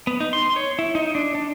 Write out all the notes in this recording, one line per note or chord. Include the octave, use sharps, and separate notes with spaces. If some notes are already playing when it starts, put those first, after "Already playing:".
B3
D#4
C6
C#5
E4
D#4
D4
D4